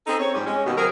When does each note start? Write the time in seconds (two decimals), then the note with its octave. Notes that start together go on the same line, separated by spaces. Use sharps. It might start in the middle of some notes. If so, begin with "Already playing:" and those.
0.07 C4 C#4 D#4 G#4 A4
0.20 C4 C#5
0.34 G#2 F3 G3 C4 C#4 G4
0.46 G#3 C#4
0.66 D#2 B2
0.77 C#3 F#3 C4 G#4 A#4